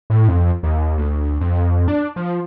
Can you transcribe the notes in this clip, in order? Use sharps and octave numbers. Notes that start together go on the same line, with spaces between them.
A2
F2
D#2
D2
F2
D4
F3